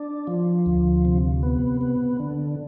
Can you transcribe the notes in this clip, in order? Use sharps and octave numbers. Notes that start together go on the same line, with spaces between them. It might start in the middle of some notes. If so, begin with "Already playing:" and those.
Already playing: D4
F3
D2
C3
B3
B3
D3